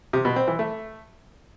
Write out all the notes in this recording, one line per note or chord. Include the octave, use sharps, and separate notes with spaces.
C3
B2
C4
E3
A3